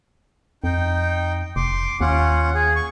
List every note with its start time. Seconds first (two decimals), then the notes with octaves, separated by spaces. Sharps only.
0.64 F2 D#4 G5
1.56 F1 C6 D6
2.01 D#2 C#4 F4 F#5
2.55 G#4
2.76 C#6